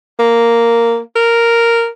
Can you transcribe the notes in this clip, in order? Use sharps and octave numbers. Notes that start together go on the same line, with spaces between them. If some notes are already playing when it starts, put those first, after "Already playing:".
A#3
A#4